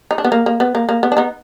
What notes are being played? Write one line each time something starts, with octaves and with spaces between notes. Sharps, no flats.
D#4
D4
B3
A#3
A#3
B3
A#3
A#3
B3
D4
B3 D#4